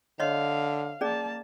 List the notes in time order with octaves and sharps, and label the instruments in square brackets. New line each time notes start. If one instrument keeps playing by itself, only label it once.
[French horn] D3 [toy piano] C#5 D#5 C6 [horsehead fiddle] F5
[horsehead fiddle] A#3 A5 [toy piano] C#4 G#4 D5